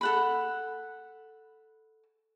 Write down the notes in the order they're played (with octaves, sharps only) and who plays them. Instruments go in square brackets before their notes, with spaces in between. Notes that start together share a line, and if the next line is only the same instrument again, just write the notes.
[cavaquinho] A4 F#5 B5